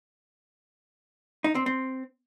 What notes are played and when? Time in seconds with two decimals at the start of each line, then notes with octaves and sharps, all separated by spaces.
1.44 D#4
1.55 C4
1.66 C4